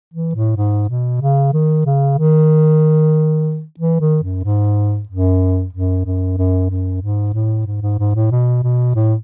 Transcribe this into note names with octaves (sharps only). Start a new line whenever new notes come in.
E3
A2
G#2
B2
C#3
D#3
C#3
D#3
E3
D#3
F#2
G#2
F#2
F#2
F#2
F#2
F#2
G#2
A2
G#2
G#2
G#2
A2
B2
B2
A2